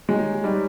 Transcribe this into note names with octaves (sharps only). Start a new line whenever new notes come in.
G#3 D#4 G4 C#5
G3 D#4 G4 C#5